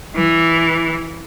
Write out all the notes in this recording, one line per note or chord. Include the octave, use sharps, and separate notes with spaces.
E3